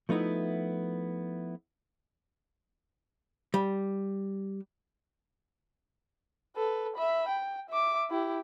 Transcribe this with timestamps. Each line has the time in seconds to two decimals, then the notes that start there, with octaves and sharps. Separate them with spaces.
0.09 F3 A3 B3 D#4 E4
3.54 G3
6.56 A4 B4
6.96 E5 B5
7.28 G5
7.70 E5 D6
8.10 E4 G4